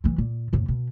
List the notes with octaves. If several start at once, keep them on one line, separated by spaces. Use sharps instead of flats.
E3 F#3
A#2
F2 A2
B2